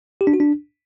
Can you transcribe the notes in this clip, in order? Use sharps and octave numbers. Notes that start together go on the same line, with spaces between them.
G4
D4
F#4
D4